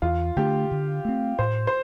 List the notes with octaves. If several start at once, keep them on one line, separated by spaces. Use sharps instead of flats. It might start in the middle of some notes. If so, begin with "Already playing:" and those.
E2 F4
D3 A3 D4 G4
D3
A3 C4
A2 C5
C5